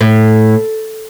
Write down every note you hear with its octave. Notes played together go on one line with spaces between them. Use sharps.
A2